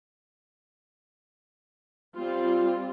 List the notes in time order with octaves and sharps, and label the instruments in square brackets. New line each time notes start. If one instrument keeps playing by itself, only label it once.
[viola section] G3 C4 F4